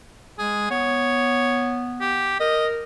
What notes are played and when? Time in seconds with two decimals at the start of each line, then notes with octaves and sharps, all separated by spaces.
0.38 G#3 G#4
0.70 B3 C#5
2.01 G4
2.40 A#4 D#5